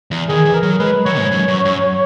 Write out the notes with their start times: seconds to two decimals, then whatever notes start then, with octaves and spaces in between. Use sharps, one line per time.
0.11 E2
0.28 D#3 G#4
0.45 E3
0.54 A#4
0.63 F#3
0.79 G#3 B4
1.05 F#3 C#5
1.18 G#2
1.32 F#2
1.48 F#2
1.65 F#2